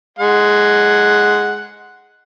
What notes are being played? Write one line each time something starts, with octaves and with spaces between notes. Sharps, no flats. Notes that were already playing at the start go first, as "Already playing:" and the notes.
G#3 F#5